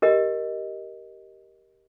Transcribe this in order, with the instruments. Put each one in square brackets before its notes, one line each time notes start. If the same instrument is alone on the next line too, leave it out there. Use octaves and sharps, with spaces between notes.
[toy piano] G4 A#4 D#5